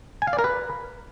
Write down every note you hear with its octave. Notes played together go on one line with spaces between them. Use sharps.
G#5
F5
D5
A#4
B4